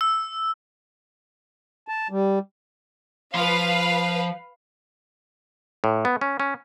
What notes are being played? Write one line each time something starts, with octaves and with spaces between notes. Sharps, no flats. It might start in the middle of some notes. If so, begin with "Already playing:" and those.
E6
A5
G3
F3 B4 F5 C6
A2
B3
C#4
C#4